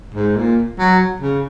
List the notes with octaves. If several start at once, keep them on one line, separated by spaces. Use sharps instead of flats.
G#2
A#2
F#3
C#3